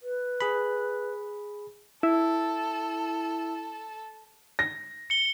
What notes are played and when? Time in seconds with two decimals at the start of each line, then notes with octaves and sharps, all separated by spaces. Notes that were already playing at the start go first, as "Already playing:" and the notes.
0.03 B4
0.41 G#4 B5
2.03 E4 A4
4.59 A#6
5.10 C#7 G7